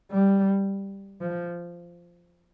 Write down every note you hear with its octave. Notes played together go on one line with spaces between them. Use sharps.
G3
F3